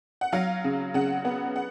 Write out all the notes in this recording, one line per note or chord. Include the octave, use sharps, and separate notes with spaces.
F#5
F#3 F5
C#3
C#3 F#5
B3 F#5
F#5